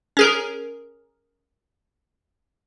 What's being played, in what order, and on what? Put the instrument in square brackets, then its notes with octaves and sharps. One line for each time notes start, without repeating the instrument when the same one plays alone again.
[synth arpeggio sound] C#4 G#4 A#4